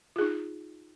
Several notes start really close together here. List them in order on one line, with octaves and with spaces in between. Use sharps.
F4 G#4 D#4